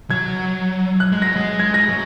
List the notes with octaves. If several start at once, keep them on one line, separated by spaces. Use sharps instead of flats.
F#3 G#6
F#6
G#3
F#3 A#6
G#3
G#6
A#6
F#3